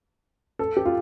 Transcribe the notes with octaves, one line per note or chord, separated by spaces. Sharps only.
A4
G4
F4